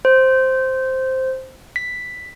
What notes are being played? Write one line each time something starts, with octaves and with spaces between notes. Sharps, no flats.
C5
B6